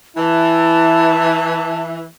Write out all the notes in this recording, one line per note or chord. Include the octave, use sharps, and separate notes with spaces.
E3 E4 A5